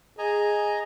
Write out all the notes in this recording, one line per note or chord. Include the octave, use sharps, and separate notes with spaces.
G#4 D#5 G#5 A#5